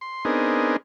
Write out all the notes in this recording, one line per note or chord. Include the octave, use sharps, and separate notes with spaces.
C6
B3 C4 D4 D#4 G#4 A#4